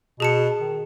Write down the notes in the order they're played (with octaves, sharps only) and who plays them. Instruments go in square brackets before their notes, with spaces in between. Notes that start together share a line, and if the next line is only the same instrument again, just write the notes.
[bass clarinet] B2 [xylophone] G#4 A5 C#7
[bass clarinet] D#3